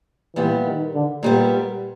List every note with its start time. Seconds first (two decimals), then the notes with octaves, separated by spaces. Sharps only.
0.35 A#2 E3 G3 B3
0.65 D#3
0.94 D3
1.23 A#2 G3 B3